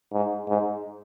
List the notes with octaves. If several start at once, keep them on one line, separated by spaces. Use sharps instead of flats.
G#2
G#2